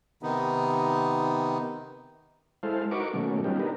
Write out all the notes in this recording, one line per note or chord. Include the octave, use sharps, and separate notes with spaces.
C3 D#3 B3 D#4
G#3 E4 A4 C5 F5
D#4 F#4 A#4 B4 C#6 D6
B2 D#3 F#3 A3 A#3 C#4
G3 B3 C#4 D#4 F4 G4
D4 D#4 A#4 B4